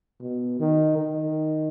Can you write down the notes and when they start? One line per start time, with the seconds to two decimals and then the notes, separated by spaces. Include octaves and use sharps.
0.21 B2
0.60 D#3
0.98 D#3